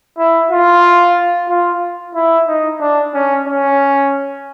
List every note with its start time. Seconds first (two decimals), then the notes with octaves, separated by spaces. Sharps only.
0.18 E4
0.51 F4
1.49 F4
2.15 E4
2.47 D#4
2.80 D4
3.14 C#4
3.47 C#4